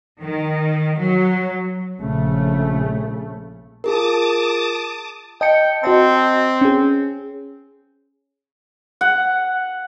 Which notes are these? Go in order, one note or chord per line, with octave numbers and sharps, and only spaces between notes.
D#3
F#3
A#1 C#3 A3
F4 G#4 A#4 A5 D6 D#6
D#5 G5 A5 C#7
C4 F#4 D#5 A5
C#4 G#4
F#5